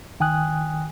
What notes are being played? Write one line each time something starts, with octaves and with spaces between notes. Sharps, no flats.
C#2 D#3 G5 G#5 D#6 F#6